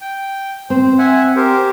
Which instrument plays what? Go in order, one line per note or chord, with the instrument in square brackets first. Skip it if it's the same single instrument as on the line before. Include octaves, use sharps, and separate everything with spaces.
[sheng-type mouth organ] G5
[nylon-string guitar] C4 [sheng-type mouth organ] C5
[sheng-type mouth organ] E5 F#5 G#5
G4 A#4 C5